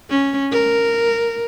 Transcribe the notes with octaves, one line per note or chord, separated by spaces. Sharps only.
C#4
A#4